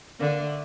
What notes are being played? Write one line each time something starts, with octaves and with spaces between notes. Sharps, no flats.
D3 A#3
A3